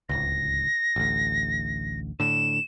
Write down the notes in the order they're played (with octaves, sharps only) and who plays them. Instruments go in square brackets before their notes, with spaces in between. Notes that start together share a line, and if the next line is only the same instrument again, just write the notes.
[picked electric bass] D1 G#1 C#2 [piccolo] A#6
[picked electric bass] A1 D2
[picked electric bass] A2 D3 [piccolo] E7